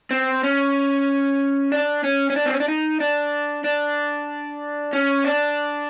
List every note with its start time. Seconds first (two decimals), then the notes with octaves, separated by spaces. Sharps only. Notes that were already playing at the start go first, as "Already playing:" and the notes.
0.11 C4
0.43 C#4
1.72 D4
2.04 C#4
2.30 C#4
2.36 D4
2.46 C4
2.53 C#4
2.60 D4
2.68 D#4
3.00 D4
3.64 D4
4.93 C#4
5.24 D4